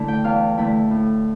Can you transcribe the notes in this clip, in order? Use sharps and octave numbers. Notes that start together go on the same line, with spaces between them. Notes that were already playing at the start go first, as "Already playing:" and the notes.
Already playing: D3 A3 E4 A5
G5
E2 F5
D3 A3 E4
A2